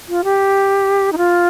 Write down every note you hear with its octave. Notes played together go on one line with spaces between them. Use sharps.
F4
G4
D#4
F4